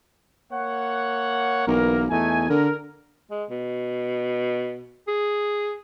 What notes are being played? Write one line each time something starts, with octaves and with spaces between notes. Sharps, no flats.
A#3 C#5 F#5
B1 E3 A#3 A#4
E2 A3 D#4 G#5
D3 A#4
G#3
B2
G#4